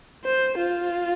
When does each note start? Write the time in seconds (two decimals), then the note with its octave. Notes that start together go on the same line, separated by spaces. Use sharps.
0.25 C5
0.58 F4